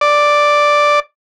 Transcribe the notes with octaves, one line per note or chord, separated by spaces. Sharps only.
D5